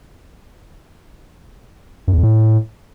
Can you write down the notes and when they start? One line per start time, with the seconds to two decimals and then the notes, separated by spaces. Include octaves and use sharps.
2.08 F#2
2.13 E2
2.18 F2
2.23 A2